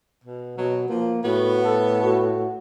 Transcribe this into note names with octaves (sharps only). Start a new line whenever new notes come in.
B2
B2 F#3
F3 A#3
A2 B3 F#4
A4
F#4